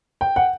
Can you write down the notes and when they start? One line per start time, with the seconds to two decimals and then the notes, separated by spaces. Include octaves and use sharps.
0.21 G5
0.36 F#5